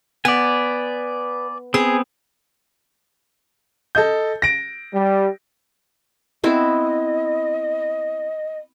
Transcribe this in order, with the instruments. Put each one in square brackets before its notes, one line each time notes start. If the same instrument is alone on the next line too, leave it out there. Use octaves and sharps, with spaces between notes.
[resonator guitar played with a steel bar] B3 [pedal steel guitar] D5 G#5
[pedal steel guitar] B3 C4 [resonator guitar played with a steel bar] G#4
[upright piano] A4 D#5 G6
A#6 D7
[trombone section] G3
[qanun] B3 C4 E4 [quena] D#5